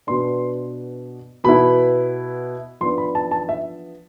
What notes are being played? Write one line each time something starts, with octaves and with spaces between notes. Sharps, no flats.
B2 B3 D4 C6
B2 B3 E4 B5
F3 B3 D4 C6
B5
A5
A5
E5